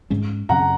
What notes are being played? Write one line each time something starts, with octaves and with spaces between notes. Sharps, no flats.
G#2 G#3 C#4
F#2 C#3 F#3 C#4 F#5 A#5